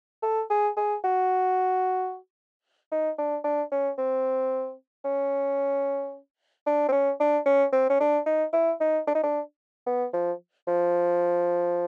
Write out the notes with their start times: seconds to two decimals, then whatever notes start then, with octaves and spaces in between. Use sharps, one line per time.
0.23 A4
0.50 G#4
0.77 G#4
1.04 F#4
2.92 D#4
3.18 D4
3.44 D4
3.72 C#4
3.98 C4
5.05 C#4
6.66 D4
6.89 C4
6.92 C#4
7.20 D4
7.46 C#4
7.73 C4
7.89 C#4
8.00 D4
8.26 D#4
8.53 E4
8.81 D#4
9.07 D4
9.15 D#4
9.23 D4
9.87 B3
10.13 F3
10.67 F3